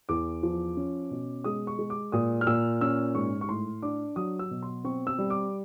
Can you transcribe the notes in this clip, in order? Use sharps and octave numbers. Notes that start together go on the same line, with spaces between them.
E2 D6
F3
C#4
B2
G#3 D#6
C#6
G#3
D6
A#2 D#6
F6
A#2 E6
C#4 E6
G#2 C#6
C#6
A2 C6
D4 D6
F#3 D#6
E6
B2
C6
C4 C#6
E6
G3
D6